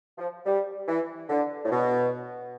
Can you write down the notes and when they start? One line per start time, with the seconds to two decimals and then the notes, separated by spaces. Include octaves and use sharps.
0.18 F3
0.46 G3
0.88 E3
1.30 D3
1.65 A2
1.71 B2